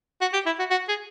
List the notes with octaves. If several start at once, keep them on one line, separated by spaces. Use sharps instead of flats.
F#4
G4
E4
F#4
F#4
G#4